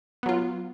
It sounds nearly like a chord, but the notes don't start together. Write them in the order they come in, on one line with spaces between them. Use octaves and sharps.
B3 F#3 F4